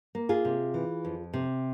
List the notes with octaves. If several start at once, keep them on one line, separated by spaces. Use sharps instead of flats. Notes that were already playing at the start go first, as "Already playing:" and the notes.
A#3
F4 G#4
C3
E3
F2
C3